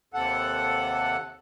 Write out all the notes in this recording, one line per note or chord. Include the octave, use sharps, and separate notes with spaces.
D#2 C3 A4 F#5